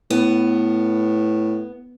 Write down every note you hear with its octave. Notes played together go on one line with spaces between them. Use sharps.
A2 B3